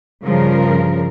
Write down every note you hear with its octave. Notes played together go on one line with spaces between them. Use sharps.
G2 C#3 F3 A#4